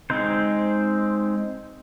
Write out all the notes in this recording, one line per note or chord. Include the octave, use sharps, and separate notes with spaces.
G#3 C4 D#4 C5